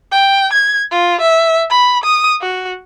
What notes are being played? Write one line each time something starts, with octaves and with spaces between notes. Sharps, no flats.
G5
G#6
F4
E5
B5
D#6
F#4